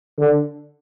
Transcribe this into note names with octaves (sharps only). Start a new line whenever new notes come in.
D3